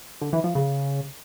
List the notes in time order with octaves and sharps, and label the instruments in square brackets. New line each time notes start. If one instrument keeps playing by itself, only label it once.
[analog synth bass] D3
E3
F3
C#3